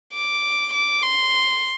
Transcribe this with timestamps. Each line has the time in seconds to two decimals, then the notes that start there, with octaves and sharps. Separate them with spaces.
0.13 D6
0.73 D6
1.03 C6